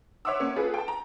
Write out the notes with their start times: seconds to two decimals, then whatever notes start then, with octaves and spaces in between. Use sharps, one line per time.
0.25 C#5 E5 F#5 C6 D6 E6
0.40 A#3 C#4 C#7
0.56 F4 G#4 A4 B4
0.74 G5 A5
0.88 A#5